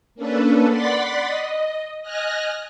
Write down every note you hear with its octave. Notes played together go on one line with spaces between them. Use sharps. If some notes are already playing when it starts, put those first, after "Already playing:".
A#3 C#4 D4 A4 B4
D5 F#5 B5 C6 A6 B6
D#5
D#5 G#5 F6 F#6 A#6